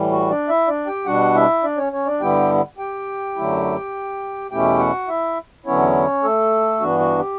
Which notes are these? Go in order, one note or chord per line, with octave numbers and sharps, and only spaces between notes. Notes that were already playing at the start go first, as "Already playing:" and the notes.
Already playing: A2 E3 G3
F#4
D4 D5
E4 E5
D4 D5
G4 G5
B2 G3 D4 F#4 F#5
E4 E5
D4 D5
C#4 C#5
C#4 C#5
D4 D5
G2 D3 G3 B3 E4 G4 G5
G4 G5
F#2 D3 F#3 A3 E4
E2 B2 A3 C#4 E4 G4 G5
F#4 F#5
E4 E5
E2 D3 F#3 B3 C#4 E4 C#5
A3 A4
G2 E3 B3 D4 F#4
F#4
G4